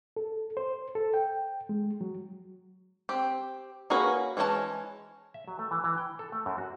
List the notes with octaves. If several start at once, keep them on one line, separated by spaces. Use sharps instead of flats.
A4
C5
A4
G5
G#3
F#3
C4 G4
A#3 C#4 F#4 G#4 B4
E3 G#3 C#4 D#4 A5
E5
F#3
A3
E3
E3
G5
A4
A3
F#2
F#4